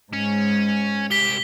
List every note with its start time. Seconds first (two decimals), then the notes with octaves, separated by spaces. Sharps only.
0.13 G#2 C#4
1.11 C2 G4 B6 G7